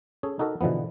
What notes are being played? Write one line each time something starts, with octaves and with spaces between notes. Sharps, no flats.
C#4 G#4 A4
D#4 F#4 A4 A#4 D#5
B2 D3 E3 F3 B3